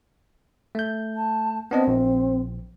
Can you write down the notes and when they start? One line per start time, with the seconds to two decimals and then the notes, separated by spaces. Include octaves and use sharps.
0.75 A3 G6
1.16 A5
1.71 B3 C4 D4 D#5
1.87 A#1